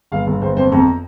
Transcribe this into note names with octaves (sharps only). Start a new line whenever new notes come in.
G1 F5
G1
G1 C5
F2 C5
F2 A#5